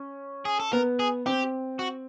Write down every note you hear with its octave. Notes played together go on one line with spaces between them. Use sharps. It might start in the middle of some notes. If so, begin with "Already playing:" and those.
Already playing: C#4
G#4
A4
B3 A#4
G#4
C4 G4
F#4